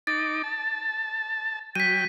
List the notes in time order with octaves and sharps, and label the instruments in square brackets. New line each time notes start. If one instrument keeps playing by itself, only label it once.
[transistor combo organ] D#4 D6 [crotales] A6
[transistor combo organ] A5
[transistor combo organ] F#3 G5 [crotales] B6 D#7